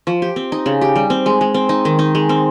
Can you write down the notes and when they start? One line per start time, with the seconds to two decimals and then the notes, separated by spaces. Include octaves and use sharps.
0.07 F3
0.22 G4
0.36 C4
0.52 D#4
0.66 C#3
0.81 G4
0.96 G3
1.10 C4
1.26 G#3
1.41 G#3
1.54 C4
1.69 D#4
1.85 D#3
1.99 D#4
2.15 G#3
2.29 C4